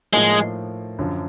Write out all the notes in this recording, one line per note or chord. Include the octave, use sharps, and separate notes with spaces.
A2 F3 G#3 A#3 D#4
F#2 D3 F3